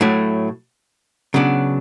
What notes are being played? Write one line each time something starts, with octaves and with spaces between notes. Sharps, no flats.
A2 F#3 A3
C#3 F#3 B3 D4